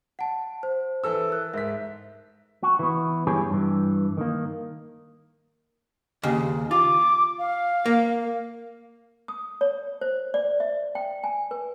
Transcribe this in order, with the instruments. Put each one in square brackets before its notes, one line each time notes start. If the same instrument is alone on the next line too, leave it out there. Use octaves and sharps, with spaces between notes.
[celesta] F#5 A5
C5
[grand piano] E3 A4 E6
[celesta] A#4 F#6
[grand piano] G#2 B6 [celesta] E5
[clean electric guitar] F#4
E3 B3
G2 E4 G4 G#4 C#5 G#5
G2 E3
D#3 A#3
[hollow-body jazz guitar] D#2 C#3
[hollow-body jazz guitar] F4 [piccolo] D6
[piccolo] F5
[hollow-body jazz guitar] A#3
[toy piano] D#6
C#5
C5
D5
E5
G5
G#5
B4